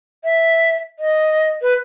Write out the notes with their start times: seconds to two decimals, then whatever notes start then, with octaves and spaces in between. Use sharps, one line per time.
0.24 E5
0.99 D#5
1.62 B4